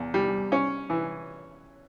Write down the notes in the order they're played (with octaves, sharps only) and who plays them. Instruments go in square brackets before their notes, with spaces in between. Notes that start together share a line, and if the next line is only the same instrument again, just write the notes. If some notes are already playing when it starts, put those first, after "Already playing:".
Already playing: [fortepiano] E2
G3
C#4
E3